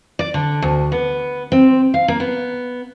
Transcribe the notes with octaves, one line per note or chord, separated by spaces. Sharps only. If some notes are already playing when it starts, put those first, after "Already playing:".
D5
D3
D2
B3
C4
F5
A#3
B3